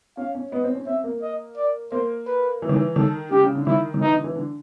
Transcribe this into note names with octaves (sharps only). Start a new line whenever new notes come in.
C#4 F5
C#4
B3 D#5
C4
C#4
C4 E5
A#3
D#5
D5
A#3 C5
B4
E3
D#3
E3
D#3 A4
C#3 G4
C#3
D3
D#3 E4
D#3
E3 D#4
D3
E3
D3